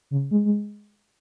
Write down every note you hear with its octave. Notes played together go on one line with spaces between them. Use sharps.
C#3
G#3
G#3